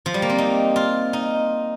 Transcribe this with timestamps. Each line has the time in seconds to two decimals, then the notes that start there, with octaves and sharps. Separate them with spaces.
0.06 F3
0.14 G3
0.22 A#3
0.30 C4
0.38 D#4
0.76 F4
1.13 D#4